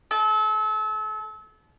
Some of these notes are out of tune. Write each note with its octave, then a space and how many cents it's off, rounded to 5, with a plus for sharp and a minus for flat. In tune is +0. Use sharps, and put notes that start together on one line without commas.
A4 -35